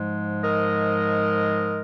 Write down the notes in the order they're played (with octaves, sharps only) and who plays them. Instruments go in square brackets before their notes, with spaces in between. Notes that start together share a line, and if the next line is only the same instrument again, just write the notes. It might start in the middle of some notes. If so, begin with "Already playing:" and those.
Already playing: [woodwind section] G#2 F3 G#3
A#4 D#5